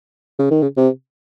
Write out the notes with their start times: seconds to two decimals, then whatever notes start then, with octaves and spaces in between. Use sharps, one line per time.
0.39 C#3
0.51 D#3
0.62 C#3
0.77 C3